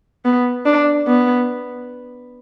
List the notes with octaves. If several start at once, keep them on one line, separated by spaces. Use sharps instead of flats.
B3
D4
B3